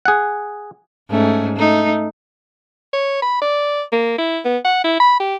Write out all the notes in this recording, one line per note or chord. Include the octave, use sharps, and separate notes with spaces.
G#4 F#5
G#2 A3 C#4
A3 D#4
C#5
B5
D5
A#3
E4
B3
F#5
E4
B5
G4